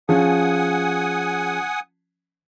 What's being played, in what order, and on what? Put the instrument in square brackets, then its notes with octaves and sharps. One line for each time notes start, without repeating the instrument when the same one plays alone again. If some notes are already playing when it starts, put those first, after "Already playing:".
[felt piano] F3 C#4 [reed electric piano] G#4 [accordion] F#5 G#5 D#6